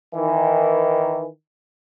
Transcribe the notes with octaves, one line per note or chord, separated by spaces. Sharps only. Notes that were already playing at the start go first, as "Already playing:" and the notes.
D#3 E3